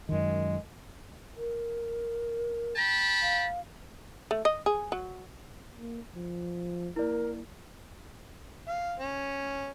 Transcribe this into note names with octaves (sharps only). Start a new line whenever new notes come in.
F#2 D#3 G#3
A#4
G5 A5 B5
F5
A3
D#5
G#4
F#3
A#3
F3
A#3 E4 A#4 D5
F5
C#4